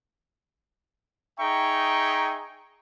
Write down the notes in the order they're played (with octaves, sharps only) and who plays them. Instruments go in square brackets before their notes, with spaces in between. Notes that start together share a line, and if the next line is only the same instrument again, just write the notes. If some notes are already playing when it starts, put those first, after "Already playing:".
[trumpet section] D#4 G#4 E5 G5 A#5 C#6